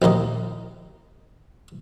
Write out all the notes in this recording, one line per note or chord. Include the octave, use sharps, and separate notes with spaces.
A#1 D#2 A#3 D#5